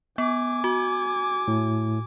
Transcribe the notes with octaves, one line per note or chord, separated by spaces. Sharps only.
B3 G#5 D6
F#4
A2